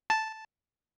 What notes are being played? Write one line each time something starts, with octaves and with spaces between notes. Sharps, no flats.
A5